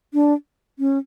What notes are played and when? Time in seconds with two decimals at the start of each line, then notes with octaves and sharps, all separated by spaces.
0.14 D4
0.79 C#4